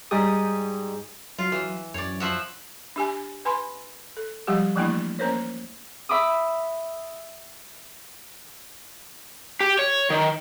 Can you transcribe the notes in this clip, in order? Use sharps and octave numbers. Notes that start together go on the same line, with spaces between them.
G#2 G3 G4 G#4 D#6
F#3 F4
E3
F#2 C#5 D5
F3 E5 F#5
D4 G4 G#5
B4 G#5 B5 C6
A4
F3 G3 G#3 G4
E3 F3 A3 A#3 D4 E4
A#3 C#4 A#4 C5 C#5
E5 B5 D6 D#6
G4
C#5
D#3